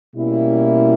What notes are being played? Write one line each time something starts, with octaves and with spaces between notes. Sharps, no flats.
B2 G3 A#3 C#4 E4